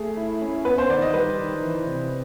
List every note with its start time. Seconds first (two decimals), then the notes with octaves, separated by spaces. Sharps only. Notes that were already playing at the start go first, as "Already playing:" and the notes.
Already playing: A3 G#4
0.17 E4
0.41 C#4
0.65 B3 B4
0.78 C5
0.90 D#3 D5
1.02 D#5
1.14 G3 B4
1.39 D#3
1.63 E3
1.87 C3